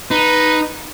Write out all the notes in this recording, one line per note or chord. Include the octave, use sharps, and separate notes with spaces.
D#4 B4